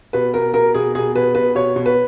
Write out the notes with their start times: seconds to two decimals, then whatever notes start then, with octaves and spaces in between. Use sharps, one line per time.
0.13 B2 B4
0.34 B2 A#4
0.54 B2 A#4
0.74 B2 G#4
0.95 B2 G#4
1.15 B2 B4
1.35 B2 B4
1.55 B2 C#5
1.76 B2
1.86 B4